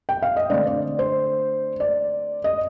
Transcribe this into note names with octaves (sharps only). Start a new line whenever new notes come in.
G5
F5
D#5
D3 A3 C4 D5
D5
C5
D5
D#5